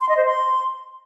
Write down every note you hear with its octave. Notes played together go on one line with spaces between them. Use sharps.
C6
D#5
C5
C6